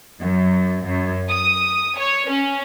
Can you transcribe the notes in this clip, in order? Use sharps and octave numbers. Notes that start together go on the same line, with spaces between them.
F#2
F#2
D#6
C#5
C#4